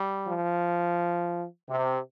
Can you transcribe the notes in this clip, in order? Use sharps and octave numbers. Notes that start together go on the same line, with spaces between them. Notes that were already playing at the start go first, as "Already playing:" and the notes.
Already playing: G3
F3
C3